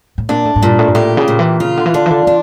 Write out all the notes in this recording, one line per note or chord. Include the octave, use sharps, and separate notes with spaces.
A2
A#2 D4
A2
A2
G2 A#2
A2
G2
A2 G4
C#3
A#2
E3
C#3 F4
D3
E3
D3 D4
E3
D3
E3 D4